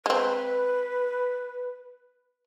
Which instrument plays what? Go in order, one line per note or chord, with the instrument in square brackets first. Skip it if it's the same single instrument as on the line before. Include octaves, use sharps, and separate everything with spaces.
[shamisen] G#3 C4 [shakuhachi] B4